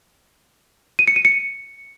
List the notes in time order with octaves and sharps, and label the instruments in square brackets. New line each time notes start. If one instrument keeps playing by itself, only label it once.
[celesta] D#7
C#7
D#7
C#7